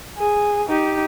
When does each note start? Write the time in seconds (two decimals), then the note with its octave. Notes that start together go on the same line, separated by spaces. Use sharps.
0.18 G#4
0.69 D#4 G4